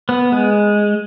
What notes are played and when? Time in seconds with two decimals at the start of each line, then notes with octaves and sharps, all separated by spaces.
0.09 B3
0.32 G#3